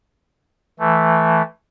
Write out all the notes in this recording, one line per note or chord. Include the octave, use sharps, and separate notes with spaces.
E3 A3